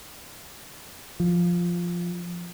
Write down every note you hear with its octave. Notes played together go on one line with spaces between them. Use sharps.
F3